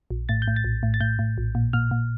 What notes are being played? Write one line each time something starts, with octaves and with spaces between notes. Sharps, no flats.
A#1
A2 A6
G6
A2
A6
A#1
A2
A6
A2 G6
A2
A#1
A#2
A#2 F6
A#2